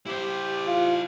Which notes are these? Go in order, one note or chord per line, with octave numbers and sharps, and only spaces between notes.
E4 G4 C5
F4